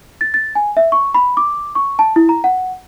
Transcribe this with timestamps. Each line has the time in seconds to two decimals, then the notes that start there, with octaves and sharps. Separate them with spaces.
0.21 A6
0.34 A6
0.55 G#5
0.77 E5
0.92 C#6
1.14 B5
1.37 D6
1.75 C#6
1.99 A5
2.16 E4
2.29 A#5
2.44 F#5